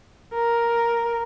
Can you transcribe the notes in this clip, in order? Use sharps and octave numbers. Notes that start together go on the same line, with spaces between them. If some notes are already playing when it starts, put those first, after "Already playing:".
A#4